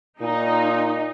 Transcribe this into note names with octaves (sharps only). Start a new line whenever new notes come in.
A#2 D#4